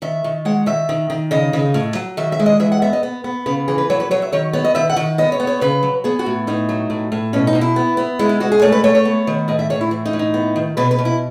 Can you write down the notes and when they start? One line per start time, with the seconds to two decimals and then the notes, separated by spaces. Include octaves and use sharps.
0.02 D#3 E5
0.24 D#3
0.45 G#3 F#5
0.66 D#3 E5
0.89 D#3
1.10 D#3
1.31 C#3 D#5
1.53 C#3
1.74 A2
1.95 F#3
2.17 D#3 E5
2.32 E5
2.39 G#3
2.46 D#5
2.60 E3 E5
2.72 F#5
2.82 B3 E5
2.93 D#5
3.03 B3
3.24 B3
3.46 C#3 B4
3.68 E3 G#4
3.78 B4
3.90 F#3 C#5
4.00 B4
4.11 F#3 C#5
4.22 E5
4.32 D#3 C#5
4.53 B3 C#5
4.64 D#5
4.75 D#3 E5
4.90 F#5
4.96 D#3
5.18 B3 D#5
5.32 C#5
5.40 B3
5.47 C#5
5.61 C#3 B4
5.83 F#3
6.04 B3 G#4
6.19 F#4
6.26 A2
6.47 A2 D#4
6.69 F#3
6.90 A2
7.12 A2
7.33 B2 C#4
7.47 D#4
7.55 B2
7.61 E4
7.76 B3
7.97 B3
8.19 G#3 E4
8.29 E4
8.40 G#3 F#4
8.52 G#4
8.62 A3 C#5
8.72 B4
8.84 A3 C#5
8.95 C#5
9.05 B3
9.27 D#3
9.48 A2 D#5
9.59 E5
9.70 A2 C#5
9.81 E4
9.91 E3
10.05 D#4
10.13 A2
10.19 D#4
10.34 B3
10.56 D#3
10.77 B2 B4
10.91 B4
10.99 B2
11.05 E4